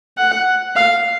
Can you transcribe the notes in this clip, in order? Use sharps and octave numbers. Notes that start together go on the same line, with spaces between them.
F#5
F5